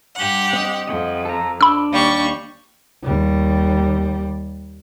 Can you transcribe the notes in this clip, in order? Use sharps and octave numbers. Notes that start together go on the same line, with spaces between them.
G2 G4 F#5
C4 D#5
F2 D#5 F#5 G5
A4 A#5
D4 B5 E6
D#2 G3 C#6
D#2 G3